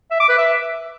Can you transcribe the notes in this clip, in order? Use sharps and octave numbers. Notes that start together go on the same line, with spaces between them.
E5
D6
B4
E5